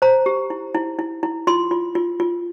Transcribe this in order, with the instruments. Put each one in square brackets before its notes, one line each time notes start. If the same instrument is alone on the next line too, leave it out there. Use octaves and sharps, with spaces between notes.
[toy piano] C5 A#5
G4
E4
E4
E4
E4
F4 C6
F4
F4
F4